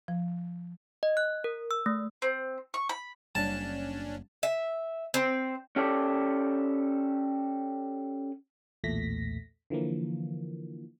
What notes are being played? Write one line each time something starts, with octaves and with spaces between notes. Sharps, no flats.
F3
D#5
F#6
A#4
E6
A3
C4
C#6
B5
F#1 G3 C#4 D4 A5
E5
C4
C#4 G4 A4 D5
B1 E2 A#2 A3 A#6 B6
D3 E3 F3 A#3